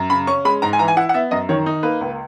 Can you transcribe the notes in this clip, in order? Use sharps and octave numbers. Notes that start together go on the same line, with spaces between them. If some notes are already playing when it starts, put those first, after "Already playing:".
Already playing: F#2
C#3 B5
C#4 C#6
G#3 B5
G#2 A#5
G#5
E3 A#5
G#5
E4 F#5
F#5
B3 E5
F#2 D#5
D#3 C#5
D#4
A#3 B4
C#2